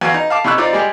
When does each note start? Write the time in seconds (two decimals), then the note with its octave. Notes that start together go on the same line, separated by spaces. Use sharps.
0.01 E2 F#4 F5
0.14 D#4
0.30 F5 A5 D6
0.44 C3 D#4 E4 C#6 E6 F#6
0.58 C4 D#4 F4 D5 D6
0.73 G3 G#3 G4